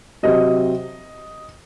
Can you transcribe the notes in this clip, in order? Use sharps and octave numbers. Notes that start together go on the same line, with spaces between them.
C3 F#3 C4 D#5